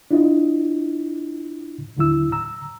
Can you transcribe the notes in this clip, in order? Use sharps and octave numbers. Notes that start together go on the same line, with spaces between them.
D4 E4 F4 D#5
D#2 D3 F#3 E4 E6
A#5 E6